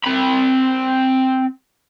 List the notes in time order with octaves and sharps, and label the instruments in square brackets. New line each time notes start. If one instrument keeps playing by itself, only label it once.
[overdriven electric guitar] C4 B5